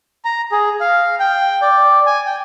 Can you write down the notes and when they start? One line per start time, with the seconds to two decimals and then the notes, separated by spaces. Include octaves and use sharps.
0.25 A#5
0.52 G#4
0.80 F5
1.20 G5
1.62 D5
2.06 G#5
2.26 G5